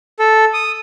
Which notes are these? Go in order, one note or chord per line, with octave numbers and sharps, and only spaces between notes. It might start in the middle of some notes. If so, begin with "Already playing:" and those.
A4
D#6